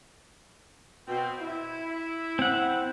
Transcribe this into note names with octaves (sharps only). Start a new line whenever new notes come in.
B2 C4
E4
C4 F#5